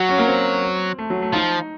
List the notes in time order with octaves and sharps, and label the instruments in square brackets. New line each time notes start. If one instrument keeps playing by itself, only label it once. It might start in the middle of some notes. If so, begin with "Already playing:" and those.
Already playing: [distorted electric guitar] F#3 [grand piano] F#4
[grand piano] C#4
A#3
C4
A3
F#3
A3
[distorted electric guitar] F3 [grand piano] D#4